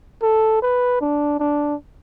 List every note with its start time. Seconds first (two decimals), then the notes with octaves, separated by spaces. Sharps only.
0.22 A4
0.62 B4
1.01 D4
1.40 D4